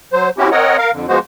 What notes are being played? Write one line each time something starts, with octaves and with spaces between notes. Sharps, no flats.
F#3 C5
C4 C#4 E4 F#4 G4
C4 A#4 C#5 D#5 F#5
A#4 F5
F2 D3
F3 G#3 B3 F#4 C5